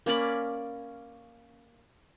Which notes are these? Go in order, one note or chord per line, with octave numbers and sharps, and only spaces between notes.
A#3 C#4 D5 B5